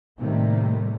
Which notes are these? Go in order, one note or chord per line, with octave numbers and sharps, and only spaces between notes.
A2 C3 D#3 G3 A3 A#3